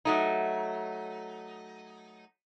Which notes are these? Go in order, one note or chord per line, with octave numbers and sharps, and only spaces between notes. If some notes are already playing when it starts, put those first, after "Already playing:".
F#3 A3 D#4